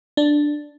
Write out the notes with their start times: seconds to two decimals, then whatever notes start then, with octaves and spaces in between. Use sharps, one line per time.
0.17 D4